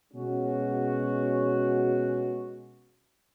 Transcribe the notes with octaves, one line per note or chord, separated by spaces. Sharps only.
B2 G#3 C#4 F#4